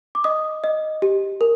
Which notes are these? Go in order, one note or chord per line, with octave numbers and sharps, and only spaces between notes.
D6
D#5 D#6
D#5
G4
A#4